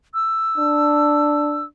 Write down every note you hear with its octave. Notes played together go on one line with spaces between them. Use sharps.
E6
D4